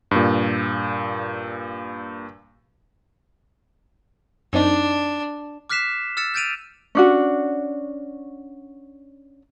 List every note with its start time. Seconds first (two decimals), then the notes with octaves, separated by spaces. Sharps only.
0.11 G2 A#2
4.53 F#2 C4 D4 D#4
5.70 D6 F6 F#6 B6 C7 E7
6.17 E6 F6 A6 C#7 E7
6.34 F6 G6 A6 D7 D#7 F7
6.95 C#4 D4 F#4